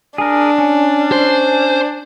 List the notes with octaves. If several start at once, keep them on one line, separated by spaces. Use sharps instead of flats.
D4 G#4 A#4
C#4
C5